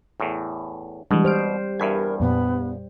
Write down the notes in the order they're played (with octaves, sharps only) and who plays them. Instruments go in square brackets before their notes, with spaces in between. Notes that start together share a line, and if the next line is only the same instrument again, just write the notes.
[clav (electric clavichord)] E2 A2
[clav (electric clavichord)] B2 [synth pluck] E3 G#3 D4 [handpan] G3
[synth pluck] G4 F6 D7 [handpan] C5
[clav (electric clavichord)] E2 G2 [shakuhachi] A#4 [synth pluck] E5 B5 G#6
[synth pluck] F2 A#2 [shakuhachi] B3